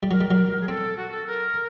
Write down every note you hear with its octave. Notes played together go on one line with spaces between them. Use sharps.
G3
F#3 A#4
G3
F#3
G#4
C4 A4
F#4
A4
A#4